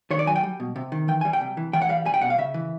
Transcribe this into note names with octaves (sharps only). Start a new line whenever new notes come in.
D#3 C#5
D5
F#3 G#5
G5
G3
B2
C3
D#3
E3 G5
G3 G#5
G5
C3
E3
E3 G5
F#5
G3 F5
G3 G#5
G5
B2 F#5
F5
C#3 E5
E3